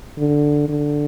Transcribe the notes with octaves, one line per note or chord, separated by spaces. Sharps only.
D3
D3